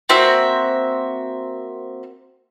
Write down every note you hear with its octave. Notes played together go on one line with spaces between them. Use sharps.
A#3 C4 F#4 E5